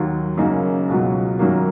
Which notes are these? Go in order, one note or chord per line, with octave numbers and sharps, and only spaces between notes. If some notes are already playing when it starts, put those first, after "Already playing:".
Already playing: D#2 D#3 F#3
F#2 C#3 F#3 A#3 D#4
C#2 B2 F#3
F#2 D#3 F#3 A#3